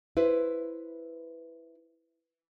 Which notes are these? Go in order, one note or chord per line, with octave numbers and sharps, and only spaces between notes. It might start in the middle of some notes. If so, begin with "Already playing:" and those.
E4 B4 C5